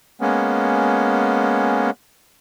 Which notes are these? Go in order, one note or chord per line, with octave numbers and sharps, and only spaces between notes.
G#3 A#3 B3 C#4